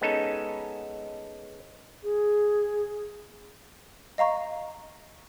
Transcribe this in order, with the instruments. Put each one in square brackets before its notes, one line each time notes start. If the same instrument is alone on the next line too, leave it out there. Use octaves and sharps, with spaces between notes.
[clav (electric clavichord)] G#3 B3 C#4 D#4 A4
[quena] G#4
[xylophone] D#5 F5 A#5 C#6